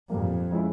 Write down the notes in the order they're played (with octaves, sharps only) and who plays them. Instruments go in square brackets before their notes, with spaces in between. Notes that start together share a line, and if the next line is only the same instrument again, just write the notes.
[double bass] F2 [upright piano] A#2 G3 A#3
[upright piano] F3 G#3 C#4 E4